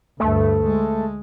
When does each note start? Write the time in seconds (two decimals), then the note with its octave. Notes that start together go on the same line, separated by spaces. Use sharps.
0.20 D2 G2 A3
0.66 G#3